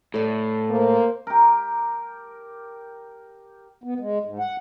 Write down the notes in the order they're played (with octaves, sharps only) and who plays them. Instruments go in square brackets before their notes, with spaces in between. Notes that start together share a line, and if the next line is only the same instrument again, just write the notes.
[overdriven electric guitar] A2 [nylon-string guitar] A4 D5
[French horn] A#3 [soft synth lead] C5
[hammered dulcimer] G4 A#4
[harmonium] B3
G#3
G#2
F#5